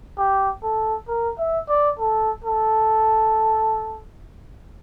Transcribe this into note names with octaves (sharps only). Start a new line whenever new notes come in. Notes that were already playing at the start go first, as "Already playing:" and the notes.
G4
A4
A#4
E5
D5
A4
A4